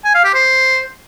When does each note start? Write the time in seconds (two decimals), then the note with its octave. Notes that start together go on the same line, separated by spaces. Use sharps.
0.05 G#5
0.15 F5
0.24 G4
0.34 C5